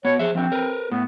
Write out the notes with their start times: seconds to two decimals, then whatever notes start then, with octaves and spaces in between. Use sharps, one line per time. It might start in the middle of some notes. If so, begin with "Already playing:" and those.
0.05 B3 F#4 C#5
0.19 F3 G#4 E5
0.35 F3 C4 D4
0.52 A#4 B4
0.91 A2 B3